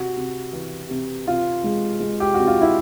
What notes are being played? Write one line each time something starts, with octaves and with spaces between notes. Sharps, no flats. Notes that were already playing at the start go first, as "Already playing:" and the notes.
Already playing: C3 F#4
C3
E3
C3
C3 F4
G#3
G#3
G4
C3 F#4
F4
E4